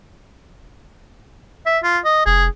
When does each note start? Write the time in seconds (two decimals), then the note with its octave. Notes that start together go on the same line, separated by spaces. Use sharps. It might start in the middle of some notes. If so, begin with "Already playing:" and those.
1.66 E5
1.83 F4
2.05 D#5
2.26 F1 G#4